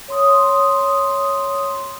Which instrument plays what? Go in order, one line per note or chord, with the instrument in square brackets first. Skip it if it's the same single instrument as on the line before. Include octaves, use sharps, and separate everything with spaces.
[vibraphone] C#5 C6 D#6